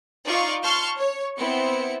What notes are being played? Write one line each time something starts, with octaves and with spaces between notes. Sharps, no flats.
D#4 F4 D5 F5 C#6
A5 C6 C#6 F6 G6
C#5
B3 C4 E4 C#7